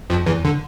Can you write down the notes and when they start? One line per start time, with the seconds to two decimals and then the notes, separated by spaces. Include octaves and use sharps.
0.10 F2 F3
0.26 E2 E3
0.45 D3